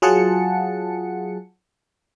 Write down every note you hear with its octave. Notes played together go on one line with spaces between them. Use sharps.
F#3 F4 G#4 F#5 A5 C#7